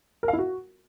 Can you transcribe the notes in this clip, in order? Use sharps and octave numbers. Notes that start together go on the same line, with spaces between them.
A#4
F5
E4
F#4